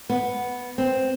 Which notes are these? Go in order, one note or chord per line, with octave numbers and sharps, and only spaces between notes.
B3
C4